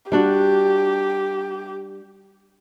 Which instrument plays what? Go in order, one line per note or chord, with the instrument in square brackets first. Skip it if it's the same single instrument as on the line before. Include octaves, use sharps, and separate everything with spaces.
[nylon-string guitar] G3 D4 F#4 [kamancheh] G4